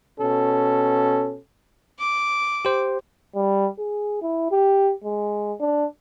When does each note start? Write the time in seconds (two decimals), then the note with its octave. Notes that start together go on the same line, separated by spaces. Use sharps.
0.19 B2 C#4 A4
1.99 D6
2.65 G4 C5
3.35 G3
3.79 G#4
4.22 E4
4.51 G4
5.04 G#3
5.60 D4